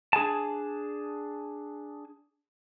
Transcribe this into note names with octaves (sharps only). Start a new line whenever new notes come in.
D4 G#4 G#5 A5